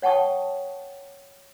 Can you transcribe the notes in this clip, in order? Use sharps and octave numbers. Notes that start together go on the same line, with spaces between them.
C#5 F#5 G5 A5 C#6 D#6